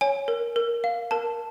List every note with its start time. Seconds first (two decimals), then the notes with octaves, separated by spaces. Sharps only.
0.01 C#5 G#5
0.28 A#4
0.56 A#4
0.84 F5
1.11 A#4 A5